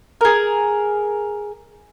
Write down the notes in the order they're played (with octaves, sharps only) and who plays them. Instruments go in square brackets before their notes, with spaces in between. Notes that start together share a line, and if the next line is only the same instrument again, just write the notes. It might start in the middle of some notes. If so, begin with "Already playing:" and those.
[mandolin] G#4 A#4